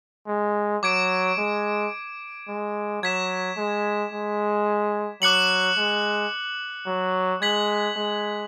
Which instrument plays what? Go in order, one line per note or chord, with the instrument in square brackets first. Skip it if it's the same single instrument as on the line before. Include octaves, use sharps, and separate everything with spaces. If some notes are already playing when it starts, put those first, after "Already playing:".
[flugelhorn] G#3
[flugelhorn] F#3 [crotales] D6 G#6 D7
[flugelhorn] G#3
G#3
[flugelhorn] F#3 [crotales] G#6 B6 E7
[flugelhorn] G#3
G#3
[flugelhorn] F#3 [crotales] D6 F#6 C#7 F#7
[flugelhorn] G#3
F#3
[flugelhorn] G#3 [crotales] G#6 B6 F#7
[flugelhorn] G#3